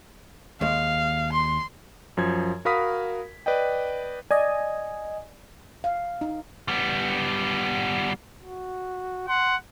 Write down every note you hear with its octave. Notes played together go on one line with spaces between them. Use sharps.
D#2 G#3 F5
C6
F#2 F3 G#6
F#4 A#4 F5 B5 D#6 B6
B4 D5 D#5 G5
D5 D#5 G#5
F5
D#4
G3 B3
F#4
F#5 C6